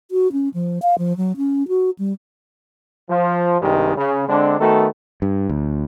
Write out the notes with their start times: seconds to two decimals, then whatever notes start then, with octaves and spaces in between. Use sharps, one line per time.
0.11 F#4
0.32 C#4
0.54 F3
0.82 F5
0.98 F3
1.17 F#3
1.37 C#4
1.68 F#4
1.99 G3
3.10 F3
3.61 C2 G2 D#3 G3 G#3
3.97 C#3
4.27 D3 G#3 C4 D4
4.60 D#3 A3 B3 F#4 A4
5.22 G2
5.49 D2